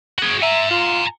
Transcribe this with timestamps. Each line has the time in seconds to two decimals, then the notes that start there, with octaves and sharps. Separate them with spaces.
0.18 F#4 G#4
0.42 E5 G#5 A#5
0.70 F4